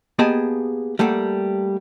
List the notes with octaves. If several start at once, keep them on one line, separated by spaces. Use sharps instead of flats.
A#3 B3 G4 G#4 D#5 A5
G3 A3 A#3 A4 F#5